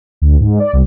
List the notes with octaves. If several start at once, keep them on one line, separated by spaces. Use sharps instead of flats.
D2
G#2
D5
C2